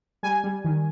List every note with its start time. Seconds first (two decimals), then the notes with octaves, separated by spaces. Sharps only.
0.23 G3 G#5
0.44 G3
0.65 D#3